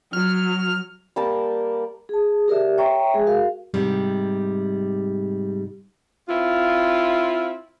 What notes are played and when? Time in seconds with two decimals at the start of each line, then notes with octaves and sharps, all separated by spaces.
0.13 F#3 F6
1.16 G3 A#3 A#4 A5
2.09 G#4 A5
2.48 G4 A#4 D5 E5
2.78 C#5 E5 G5 A#5 C#6
3.14 G#3 G#4
3.27 F#4 A#4 F5
3.74 G#2 C3 G3
6.28 C4 E4 F4